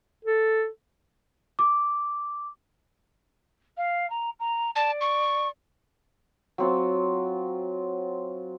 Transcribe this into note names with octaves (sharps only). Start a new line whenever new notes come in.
A4
D6
F5
A#5
A#5
D5 A5
C#6
F#3 C4 F4